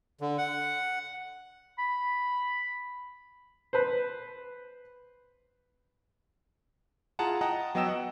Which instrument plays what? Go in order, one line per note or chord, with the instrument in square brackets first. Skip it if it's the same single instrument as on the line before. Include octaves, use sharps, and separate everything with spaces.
[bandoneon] D3
F#5
[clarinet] B5
[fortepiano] B4 C5
[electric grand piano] E4 F4 G#4 F#5 A5 A#5
D#5 F#5 G5 A5 A#5 D#6
F#3 B3 D#5 G5 E6 E7
F#5